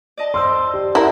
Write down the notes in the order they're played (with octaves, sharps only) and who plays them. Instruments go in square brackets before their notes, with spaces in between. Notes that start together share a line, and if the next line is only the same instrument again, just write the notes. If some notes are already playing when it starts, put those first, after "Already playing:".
[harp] D5 D#5 A5
[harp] C5 D5 [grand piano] C6 E6
[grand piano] G4
[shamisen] E4 A#4 [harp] G4 C5 [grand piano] E5 F#5 A#5